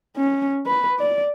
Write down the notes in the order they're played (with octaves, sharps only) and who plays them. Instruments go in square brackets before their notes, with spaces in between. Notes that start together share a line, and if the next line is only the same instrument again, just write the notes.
[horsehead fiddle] C#4
B4
D5